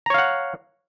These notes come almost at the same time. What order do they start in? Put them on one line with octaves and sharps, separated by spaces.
A#5 C#5 F5 F#5